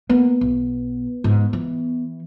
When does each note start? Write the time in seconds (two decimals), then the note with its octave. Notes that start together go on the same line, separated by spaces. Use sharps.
0.10 A#3 B3
0.41 B1
1.24 G#2
1.53 E3